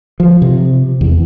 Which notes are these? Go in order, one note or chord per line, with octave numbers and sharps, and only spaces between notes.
F3
C3
E2